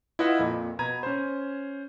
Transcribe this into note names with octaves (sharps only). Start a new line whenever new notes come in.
E4 F4 B4 D#5 E5 F#5
F2 A#2
B2 A#5 B5 G#6 D#7
C#4 C5